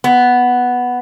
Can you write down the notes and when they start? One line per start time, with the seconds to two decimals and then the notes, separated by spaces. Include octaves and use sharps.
0.04 B3